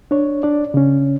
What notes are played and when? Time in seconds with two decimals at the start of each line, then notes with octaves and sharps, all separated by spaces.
0.11 D4 C#5
0.43 D4 D5
0.74 C#3 C#4